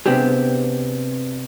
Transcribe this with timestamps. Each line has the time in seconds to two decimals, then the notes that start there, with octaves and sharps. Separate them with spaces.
0.06 C3 B3 C4 D4 G4 G#4